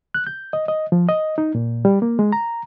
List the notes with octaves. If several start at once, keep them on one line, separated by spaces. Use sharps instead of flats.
F#6
G6
D#5
D#5
F3
D#5
D#4
A#2
G3
A#3
G#3
A#5